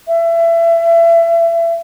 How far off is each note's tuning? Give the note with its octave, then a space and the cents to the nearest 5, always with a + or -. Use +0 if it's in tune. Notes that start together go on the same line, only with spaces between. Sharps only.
E5 +30